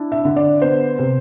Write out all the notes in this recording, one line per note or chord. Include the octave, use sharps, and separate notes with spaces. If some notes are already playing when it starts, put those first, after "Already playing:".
Already playing: D4 E4
E5
D3
D5
B3 C5
C3